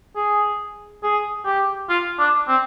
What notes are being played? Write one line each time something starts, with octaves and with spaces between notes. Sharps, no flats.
G#4
G#4
G4
F4
D4
C4